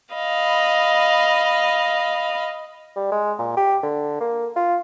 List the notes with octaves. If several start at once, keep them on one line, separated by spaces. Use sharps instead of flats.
D#5 F5 B5
G3
G#3
A#2
G4
D3
A#3
F4